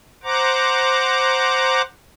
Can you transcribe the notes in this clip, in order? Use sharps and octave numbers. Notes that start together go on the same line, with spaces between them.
C5 F#5 A#5 D6